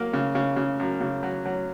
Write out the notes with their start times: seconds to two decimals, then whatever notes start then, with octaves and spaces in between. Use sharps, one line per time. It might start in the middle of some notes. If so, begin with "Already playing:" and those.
Already playing: F#3 A#3
0.13 C#3
0.35 C#3
0.56 C#3
0.80 F#2
1.01 C#3
1.23 F#3
1.46 F#3